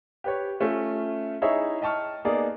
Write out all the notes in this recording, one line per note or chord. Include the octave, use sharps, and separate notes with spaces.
G4 B4 C#5
A3 C#4 F4 E5
D#4 E4 G#4 C#5 E5
D#5 G5 A5 C#6 F6
A#3 B3 D#4 G#4 D5